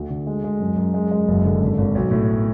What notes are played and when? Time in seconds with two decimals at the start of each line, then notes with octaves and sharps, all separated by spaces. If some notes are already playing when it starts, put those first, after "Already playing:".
Already playing: D2
0.10 D3
0.27 G#3
0.44 G#3
0.60 F#2
0.77 F#2
0.94 G#3
1.11 G#3
1.28 F#1
1.45 D3
1.61 G#1
1.78 G#1
1.95 B1
2.11 A2